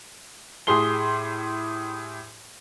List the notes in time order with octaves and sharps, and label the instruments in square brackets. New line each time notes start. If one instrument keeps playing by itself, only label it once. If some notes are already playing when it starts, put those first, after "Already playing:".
[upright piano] A2 G4 G#4 C6 G7